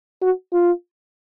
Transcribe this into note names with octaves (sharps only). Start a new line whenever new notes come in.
F#4
F4